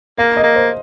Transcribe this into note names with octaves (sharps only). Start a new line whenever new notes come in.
A#3 F5
D#5
A#3
C5